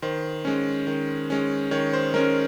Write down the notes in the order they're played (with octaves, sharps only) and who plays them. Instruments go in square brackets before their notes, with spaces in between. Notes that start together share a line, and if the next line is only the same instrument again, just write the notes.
[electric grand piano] D#3 C5
G#3 C#4
D#3
G#3 C#4
D#3 C#5
C5
G#3 C#4 A#4